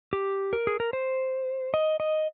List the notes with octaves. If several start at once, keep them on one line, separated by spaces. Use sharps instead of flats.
G4
A#4
G#4
A#4
C5
D#5
D#5